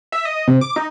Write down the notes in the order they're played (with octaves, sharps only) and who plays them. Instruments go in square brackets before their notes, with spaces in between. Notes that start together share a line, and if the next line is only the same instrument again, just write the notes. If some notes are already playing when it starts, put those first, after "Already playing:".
[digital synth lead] E5
D#5
C3
D6
D#4